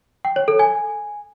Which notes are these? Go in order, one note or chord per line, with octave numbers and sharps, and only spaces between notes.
G5
C#5
A4
G#5